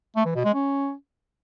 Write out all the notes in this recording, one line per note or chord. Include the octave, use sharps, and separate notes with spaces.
A3
E3
B2
G#3
C#4